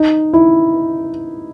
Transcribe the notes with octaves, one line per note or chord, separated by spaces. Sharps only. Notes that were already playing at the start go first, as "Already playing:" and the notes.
Already playing: D#4
E4